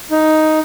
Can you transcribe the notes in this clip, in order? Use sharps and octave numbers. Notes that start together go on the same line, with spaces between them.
D#4